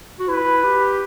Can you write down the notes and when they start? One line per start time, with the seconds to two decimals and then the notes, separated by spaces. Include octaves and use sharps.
0.20 F#4
0.28 E4 B4
0.64 G4